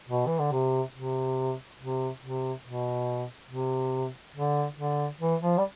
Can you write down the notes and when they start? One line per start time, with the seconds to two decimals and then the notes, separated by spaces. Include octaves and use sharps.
0.09 B2
0.26 E3
0.39 D3
0.52 C3
0.94 C3
1.80 C3
2.22 C3
2.65 B2
3.50 C3
4.36 D3
4.78 D3
5.20 E3
5.41 F3
5.58 G3